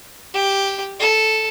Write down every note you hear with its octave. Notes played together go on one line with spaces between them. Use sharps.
G4
A4